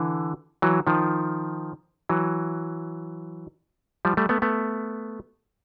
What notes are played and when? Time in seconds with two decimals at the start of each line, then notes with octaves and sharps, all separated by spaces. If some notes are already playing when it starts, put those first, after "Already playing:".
Already playing: D3 E3
0.62 E3 F#3
0.87 D#3 F3
2.09 E3 F#3
4.05 F3 G3
4.17 G3 A3
4.29 A3 B3
4.42 A3 B3